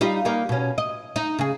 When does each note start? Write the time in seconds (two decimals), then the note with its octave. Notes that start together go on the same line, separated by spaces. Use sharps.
0.01 G3 D#4 F4
0.25 G3 A#3 D#4
0.49 B2 C#4
0.78 D#5
1.16 D#4
1.39 C#3 G#4